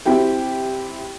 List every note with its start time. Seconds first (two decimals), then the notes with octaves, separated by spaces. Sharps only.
0.06 C4 E4 G4 G5